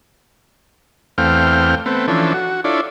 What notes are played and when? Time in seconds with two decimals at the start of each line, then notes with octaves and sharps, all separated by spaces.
1.18 E2 A3 C4 F5 G5 F6
1.86 A3 B3 C4
2.08 E3 F3 C#4 D4 A4
2.34 F#4
2.64 D4 E4 F4 A4 C#5 D5